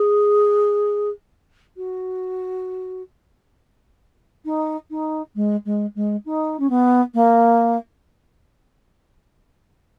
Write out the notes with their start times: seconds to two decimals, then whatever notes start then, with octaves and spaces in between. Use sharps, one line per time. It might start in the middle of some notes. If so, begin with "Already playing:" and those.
Already playing: G#4
1.76 F#4
4.45 D#4
4.90 D#4
5.35 G#3
5.65 G#3
5.95 G#3
6.25 D#4
6.59 C#4
6.69 B3
7.14 A#3